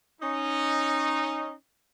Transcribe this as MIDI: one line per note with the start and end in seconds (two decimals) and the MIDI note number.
0.21 1.52 61
0.21 1.52 63